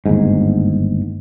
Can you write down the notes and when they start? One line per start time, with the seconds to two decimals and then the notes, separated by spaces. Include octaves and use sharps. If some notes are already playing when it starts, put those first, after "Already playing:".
0.06 G1 D#2 G#2